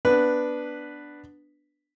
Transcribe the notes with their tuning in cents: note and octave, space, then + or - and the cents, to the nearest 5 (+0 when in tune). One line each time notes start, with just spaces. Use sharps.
B3 +0 D4 +0 B4 +0